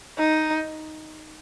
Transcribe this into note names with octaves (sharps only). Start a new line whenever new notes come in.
D#4